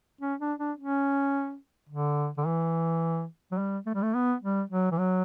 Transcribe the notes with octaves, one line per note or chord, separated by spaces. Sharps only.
C#4
D4
D4
C#4
D3
D3
E3
F#3
G3
A3
G3
A3
B3
G3
F#3
E3
F#3